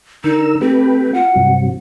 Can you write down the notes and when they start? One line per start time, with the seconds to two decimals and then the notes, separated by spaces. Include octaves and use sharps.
0.24 D3 D#4 A#4 E6
0.61 A3 C4 G4 B4
1.14 F4 F#5
1.36 G2 C3 F#3